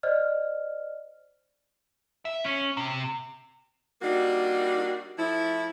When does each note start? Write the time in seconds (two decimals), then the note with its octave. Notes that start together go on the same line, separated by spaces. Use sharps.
0.03 C5 D5 D#5 F6
2.25 E5
2.45 C#4
2.77 C3
4.02 G3 A#3 D4 D#4 F#4
5.18 F3 A3 E4